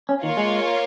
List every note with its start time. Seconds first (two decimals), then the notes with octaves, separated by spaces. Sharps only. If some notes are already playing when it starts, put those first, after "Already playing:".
0.09 C#4
0.23 D#3 A#3 F4 C#5 F5
0.37 G#3